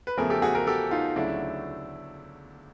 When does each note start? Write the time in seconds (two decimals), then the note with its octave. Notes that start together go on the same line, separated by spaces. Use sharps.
0.07 B4
0.17 E2 C#3 F3 A3 G#4 A#4
0.30 G4 A4
0.42 F#4 G#4
0.55 G#4 A#4
0.67 G4 A4
0.91 D#4 F4
1.16 D2 C#3 F#3 A3 D4 E4